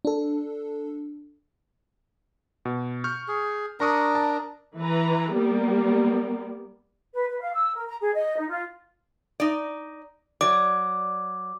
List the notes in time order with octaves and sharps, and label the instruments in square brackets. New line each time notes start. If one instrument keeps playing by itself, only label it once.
[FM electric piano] D4 A4
[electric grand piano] B2
C#6 F6 G6
[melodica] G#4
[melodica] D4 A#4 [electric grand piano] A#5 C#6 D#6
[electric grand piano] A5
[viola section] E3 B4 A#5
G3 A#3 B3
[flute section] B4
B4
F5
E6
A#4
A#5
G#4
D#5
D#4
F4
[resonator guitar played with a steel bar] D#4 D5
[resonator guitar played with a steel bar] F#3 D5 [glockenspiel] D6